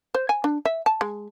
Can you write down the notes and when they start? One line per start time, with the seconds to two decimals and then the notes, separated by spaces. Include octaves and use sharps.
0.14 C5
0.29 G#5
0.44 D4
0.65 E5
0.86 A5
1.01 G#3